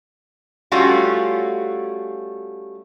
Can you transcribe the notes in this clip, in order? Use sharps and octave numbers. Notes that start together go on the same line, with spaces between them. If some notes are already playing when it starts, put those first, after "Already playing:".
G3 A3 C#4 F4 F#4